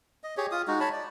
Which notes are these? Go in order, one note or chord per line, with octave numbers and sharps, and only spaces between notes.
D#5
G4 G#4 C#5
F4 D#6
G#3 D#4 F#4
C#5 A5 B5
D5